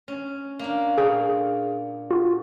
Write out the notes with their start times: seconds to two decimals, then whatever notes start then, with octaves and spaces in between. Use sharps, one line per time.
0.08 C#4
0.59 A#3 D4
0.98 A#2 G#4 G5 C#6
2.11 F4 F#4